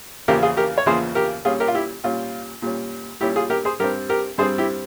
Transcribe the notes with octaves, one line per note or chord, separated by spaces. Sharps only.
E2 C#3 F3 A#3 G4 A#4
F4 G#4
G4 A#4
C#5
E2 C#3 F3 A#3 G#4 C5
G4 A#4
A#2 G3 C#4 F4 G#4
G4 A#4
F4
E4 G4
A#2 G3 C#4 F4
A#2 G3 C#4
A#2 G3 C#4 E4 G4
F4 G#4
G4 A#4
G#4 C5
G2 G3 C4 G4 A#4
G4 A#4
G2 G3 C4 G#4 C5
E4 G4